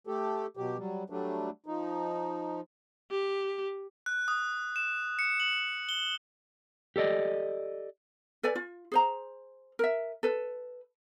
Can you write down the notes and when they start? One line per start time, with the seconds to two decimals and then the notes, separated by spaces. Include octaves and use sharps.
0.07 A3 G4 A4
0.57 B2 F#3 G4
0.78 F#3 G3
1.10 F#3 G3 A3 D4
1.66 F3 D#4
3.11 G4
4.06 F#6
4.28 D#6
4.76 E7
5.19 C#7
5.40 F#7
5.89 G7
6.96 G4 A4 D5 D#5
8.43 A4 B4 D5 G#5
8.55 F4
8.92 G#4 C5 A#5
9.79 A#4 E5
10.23 A4 B4